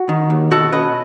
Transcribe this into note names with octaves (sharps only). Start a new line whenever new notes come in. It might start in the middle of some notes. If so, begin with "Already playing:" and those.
Already playing: F#4
D#3
D#2
B2 F#4 A4
C#4 B4 D#5